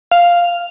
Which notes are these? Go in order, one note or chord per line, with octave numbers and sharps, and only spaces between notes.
F5